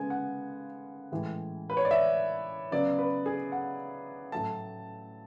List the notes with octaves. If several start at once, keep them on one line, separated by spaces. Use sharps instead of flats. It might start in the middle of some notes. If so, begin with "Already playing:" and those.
Already playing: C#3 G#3 B3 G#5
F#5
A2 E3 G#3
B4
C#5
D5
E5
C#3 F#3 B3 D5
B4
G#4
F#5
A2 F#3 A3 A5